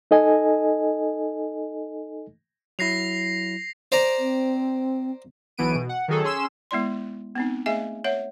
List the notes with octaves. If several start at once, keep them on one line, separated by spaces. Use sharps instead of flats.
D#4 A4 D#5 G#5
F#3 E4 A#6 C7 F7
C5 D5 A#5
C4
B1 E3 B3 D7 D#7
B2
F#5
D#3 F#3 G#4 A4
C#4 G#4 C6 E6 E7
G#3 B3 E4 D5 C6
B3 C4 D#4
A3 G#4 D#5 E5 G#5
C#5 E5 F#5